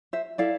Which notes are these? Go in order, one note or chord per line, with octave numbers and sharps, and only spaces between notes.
C5 E5
E4 A4 D5 F5